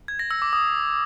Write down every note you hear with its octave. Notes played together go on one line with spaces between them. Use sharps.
G#6
A#6
E6
D6
D#6